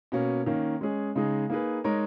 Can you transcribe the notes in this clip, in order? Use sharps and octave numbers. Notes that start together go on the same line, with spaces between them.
B2 A#3 C#4
D#3 A#3 C#4
G#3 C#4 G#4
C#3 G#3 D#4 G#4
A#3 D#4 G#4 B4
G#3 D#4 A#4 C#5